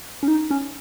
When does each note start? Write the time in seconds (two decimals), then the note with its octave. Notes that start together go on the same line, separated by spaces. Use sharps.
0.23 C#4
0.28 D#4
0.51 C#4